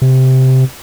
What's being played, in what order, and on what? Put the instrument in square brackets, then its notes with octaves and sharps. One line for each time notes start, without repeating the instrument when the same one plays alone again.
[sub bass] C3